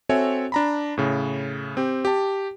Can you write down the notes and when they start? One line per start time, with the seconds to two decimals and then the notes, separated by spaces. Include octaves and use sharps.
0.09 C4 F#4 A4 C#5 E5 G#5
0.52 D4 A#5 B5
0.97 A2 C#3
1.77 C4 G4
2.05 G4 A5